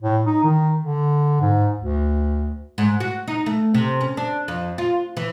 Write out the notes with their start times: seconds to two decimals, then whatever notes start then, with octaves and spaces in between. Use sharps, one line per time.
0.02 A2
0.26 D#4
0.44 D#3
0.79 D3
1.41 G#2
1.78 D2
2.78 G#2
3.00 F#4
3.28 D#4
3.46 A3
3.74 C3
4.01 C#4
4.17 D4
4.48 F2
4.78 F4
5.17 E3